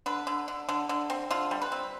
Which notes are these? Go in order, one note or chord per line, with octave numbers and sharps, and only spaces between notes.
D3 B4
D3
D3
D3
D3
C4
D3 F4
G3
B4
C4